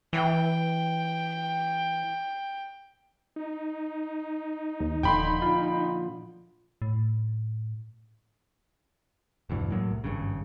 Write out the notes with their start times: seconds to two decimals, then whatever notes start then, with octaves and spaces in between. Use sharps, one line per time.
0.13 E3 G5
3.36 D#4
4.80 D#2
5.03 D#1 A#2 D3 F3 G5 B5 C6
5.42 F4
6.82 A2
9.50 E1 D2 G2 E3
9.71 A2 F#3 A#3
9.91 C2
10.04 G#1 G2 C#3